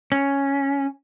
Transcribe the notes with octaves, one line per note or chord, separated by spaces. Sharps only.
C#4